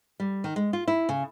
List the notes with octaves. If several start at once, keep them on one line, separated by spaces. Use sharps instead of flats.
G3
D#3
G#3
F4
E4
C#3